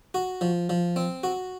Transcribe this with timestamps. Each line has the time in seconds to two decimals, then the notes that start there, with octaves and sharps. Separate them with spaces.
0.14 F#4
0.41 F3
0.69 F3
0.96 C4
1.23 F#4